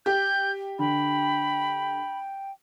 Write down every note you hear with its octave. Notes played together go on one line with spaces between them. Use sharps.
G4 G6
D3 G5 B5